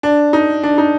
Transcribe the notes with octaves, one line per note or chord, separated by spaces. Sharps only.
D4
D#4
D4
D#4